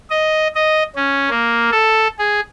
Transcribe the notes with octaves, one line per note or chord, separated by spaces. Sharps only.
D#5
D#5
C#4
A#3
A4
G#4